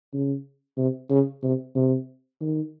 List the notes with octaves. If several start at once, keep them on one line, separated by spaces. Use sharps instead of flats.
C#3
C3
C#3
C3
C3
D#3